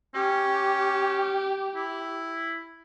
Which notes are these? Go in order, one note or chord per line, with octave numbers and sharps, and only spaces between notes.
C#4 G4
E4